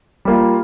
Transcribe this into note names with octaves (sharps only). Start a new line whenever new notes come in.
G3 A#3 F4